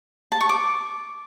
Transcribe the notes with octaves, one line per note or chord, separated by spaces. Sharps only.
A5
C#6
D6